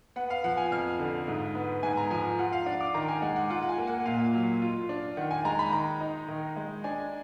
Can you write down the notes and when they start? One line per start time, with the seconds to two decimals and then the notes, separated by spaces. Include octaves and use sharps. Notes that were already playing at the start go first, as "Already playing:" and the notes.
0.16 B3 F#5
0.30 F5
0.44 F3 F#5
0.57 G#5
0.72 F2 F6
0.99 D3
1.28 G#2
1.55 B3
1.83 G#2 G#5
1.97 A#5
2.11 F3 G#5
2.39 F4 F#5
2.53 F5
2.66 D4 F#5
2.81 D6
2.94 D#3 A#5
3.08 G#5
3.22 G#3 F#5
3.36 F#5
3.50 F4 F#5
3.63 F#5
3.69 G#5
3.78 A#3
3.87 F#5
4.05 A#2 F5
4.34 F#3
4.62 F4
4.89 D4
5.17 D#3 F#5
5.31 G#5
5.45 G#3 A#5
5.59 B5
5.73 D#3 A#5
6.01 D#4
6.28 D#3
6.56 G#3
6.84 D4 G#5